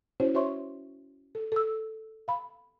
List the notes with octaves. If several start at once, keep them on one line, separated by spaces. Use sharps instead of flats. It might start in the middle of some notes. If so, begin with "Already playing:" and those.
C#4 E4 F#4 C5 C#5
F#4 C5 C#5 E5 C6 C#6
A4
A4 E6
F5 B5